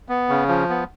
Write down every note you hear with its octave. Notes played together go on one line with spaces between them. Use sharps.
B3
C#3
F3
B3